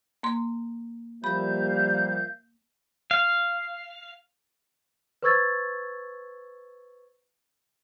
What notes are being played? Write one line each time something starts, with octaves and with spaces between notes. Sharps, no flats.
A#3 C6
F3 G3 A#3 E5 F5 B5 G6
F5
B4 C5 C#6 E6 G#6 A6